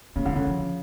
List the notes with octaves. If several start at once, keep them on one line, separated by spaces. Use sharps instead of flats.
C#3 A#3
D3 G#3
C#3 F#3
F3